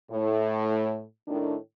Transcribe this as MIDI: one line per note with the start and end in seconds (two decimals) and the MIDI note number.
0.11 1.04 45
1.28 1.55 45
1.28 1.55 51
1.28 1.55 62